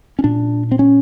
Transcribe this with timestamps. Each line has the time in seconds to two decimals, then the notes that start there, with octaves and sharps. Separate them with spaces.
0.19 C#4
0.24 A#2 D4
0.72 C4
0.79 C#4